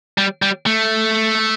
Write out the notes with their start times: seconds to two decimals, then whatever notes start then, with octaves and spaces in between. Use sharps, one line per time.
0.18 G3
0.42 G3
0.66 A3